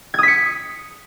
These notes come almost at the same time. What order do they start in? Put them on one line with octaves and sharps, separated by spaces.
G#6 D#6 B6 C#7